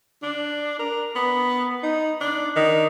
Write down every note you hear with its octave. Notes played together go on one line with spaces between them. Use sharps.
D4
A#4
B3
D#4
D4
D#3